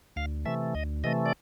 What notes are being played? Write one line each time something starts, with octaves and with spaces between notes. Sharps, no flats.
D2 F5
C3 E3 A3 E5
D2 D#5
C3 E3 A3 D#5
D5